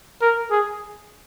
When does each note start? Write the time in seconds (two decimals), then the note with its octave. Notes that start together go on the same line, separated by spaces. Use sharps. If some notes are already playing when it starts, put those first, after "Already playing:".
0.22 A#4
0.51 G#4